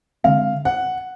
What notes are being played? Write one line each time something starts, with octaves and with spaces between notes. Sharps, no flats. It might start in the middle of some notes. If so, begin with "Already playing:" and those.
D3 F3 G#3 C4 F5
F#5